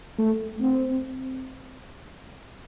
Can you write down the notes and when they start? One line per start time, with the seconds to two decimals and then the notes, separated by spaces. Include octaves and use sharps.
0.18 A3
0.61 C4